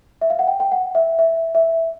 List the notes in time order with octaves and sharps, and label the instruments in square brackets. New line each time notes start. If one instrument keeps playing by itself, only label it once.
[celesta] E5
F5
F#5
G5
G5
F#5
E5
E5
E5